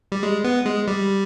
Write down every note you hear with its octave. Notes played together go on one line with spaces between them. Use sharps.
G3
G#3
B3
G#3
G3